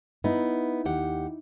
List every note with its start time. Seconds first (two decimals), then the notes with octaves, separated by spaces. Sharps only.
0.24 B3 D#4 E4
0.85 D#2 G4 F#5